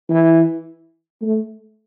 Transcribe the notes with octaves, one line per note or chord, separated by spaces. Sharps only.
E3
A3